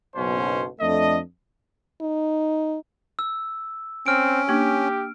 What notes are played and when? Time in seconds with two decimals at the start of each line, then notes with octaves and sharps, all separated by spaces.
0.15 F#1 B1 B2 C#4 C5
0.80 F2 A3 D4 D#5
2.01 D#4
3.19 E6
4.06 C4 C#4 F6 D7
4.49 A#3 D4 G4